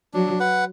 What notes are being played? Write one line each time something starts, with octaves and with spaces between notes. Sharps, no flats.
F#3 D4
B4 F#5